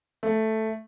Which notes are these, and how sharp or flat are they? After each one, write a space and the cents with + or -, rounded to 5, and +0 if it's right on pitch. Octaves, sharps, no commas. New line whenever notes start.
A3 +0